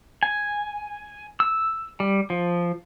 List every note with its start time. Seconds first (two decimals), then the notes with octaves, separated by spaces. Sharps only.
0.23 G#5
1.40 E6
2.00 G3
2.30 F3